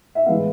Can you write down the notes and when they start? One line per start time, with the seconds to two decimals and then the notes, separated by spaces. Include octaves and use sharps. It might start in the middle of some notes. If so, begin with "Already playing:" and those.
0.15 E5
0.26 A2 E3 G#3 B3 F5